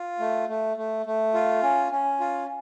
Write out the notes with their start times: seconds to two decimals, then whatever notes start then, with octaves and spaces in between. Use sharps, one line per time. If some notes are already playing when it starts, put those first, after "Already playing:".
Already playing: F4
0.19 A3
0.49 A3
0.77 A3
1.06 A3
1.34 F4
1.63 C#4
1.92 C#4
2.20 F4